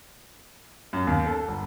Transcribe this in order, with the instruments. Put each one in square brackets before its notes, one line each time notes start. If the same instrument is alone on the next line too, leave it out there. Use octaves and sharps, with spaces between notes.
[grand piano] F#2
D#2
A4
G1